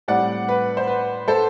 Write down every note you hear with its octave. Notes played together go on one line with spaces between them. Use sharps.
A2 G3 C4 D5 F#5
B4
C5
B4
A4 C5